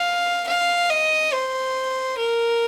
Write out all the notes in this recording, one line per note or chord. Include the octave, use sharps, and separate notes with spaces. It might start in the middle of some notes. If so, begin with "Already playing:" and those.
Already playing: F5
F5
D#5
C5
A#4